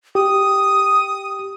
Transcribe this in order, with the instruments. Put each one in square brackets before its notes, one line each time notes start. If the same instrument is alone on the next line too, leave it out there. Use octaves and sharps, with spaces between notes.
[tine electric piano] G4 [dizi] D#6